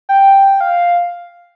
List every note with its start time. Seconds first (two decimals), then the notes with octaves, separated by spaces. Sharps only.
0.09 G5
0.61 F5